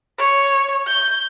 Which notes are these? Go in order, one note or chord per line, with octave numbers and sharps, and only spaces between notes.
C#5
G6